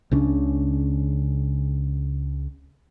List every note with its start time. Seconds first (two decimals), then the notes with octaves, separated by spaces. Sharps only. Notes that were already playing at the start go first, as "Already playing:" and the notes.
0.11 C#2 C#3 C#4 D4